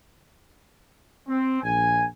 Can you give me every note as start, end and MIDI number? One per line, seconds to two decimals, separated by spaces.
1.29 1.61 60
1.62 2.05 34
1.62 2.05 80